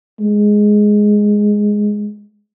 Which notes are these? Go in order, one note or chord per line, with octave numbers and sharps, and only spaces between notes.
G#3